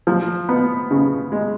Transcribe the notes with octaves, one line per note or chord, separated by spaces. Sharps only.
F3
B3
C#3
G#3